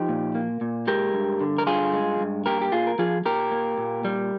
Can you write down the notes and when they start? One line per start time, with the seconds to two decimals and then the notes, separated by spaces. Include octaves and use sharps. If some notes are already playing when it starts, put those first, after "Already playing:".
Already playing: F3 D#4 G4
0.09 A#2
0.35 A#3
0.61 A#2
0.87 G#3 G4 A#4
1.14 G2
1.41 D3
1.58 A#4
1.66 G2 F4 G#4
1.93 G#3
2.20 G2
2.46 A#3 G4 A#4
2.62 G4
2.72 A#2 F4 G#4
2.87 A#4
2.99 F3 F4 G#4
3.25 A#2 G4 A#4
3.51 A#3
3.78 A#2
4.05 G3